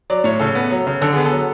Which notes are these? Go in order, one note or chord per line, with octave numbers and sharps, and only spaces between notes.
F#3 D5
A2 C#5
C#3 A4
B3
F#3
C#3
D3 A4
B3 G#4
A4
F#3